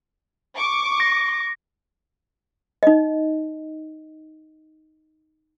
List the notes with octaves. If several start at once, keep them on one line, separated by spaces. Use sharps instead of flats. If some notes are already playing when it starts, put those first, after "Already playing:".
C#6 D6
A#6
D#4 D#5